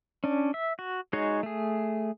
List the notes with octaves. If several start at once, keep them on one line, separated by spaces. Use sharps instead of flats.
C#4 D4
E5
F#4
G#3 D#4 F#4 G#4 C#5
A3 G#4